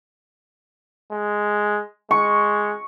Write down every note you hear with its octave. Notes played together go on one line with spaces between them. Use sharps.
G#3
G#3 C#6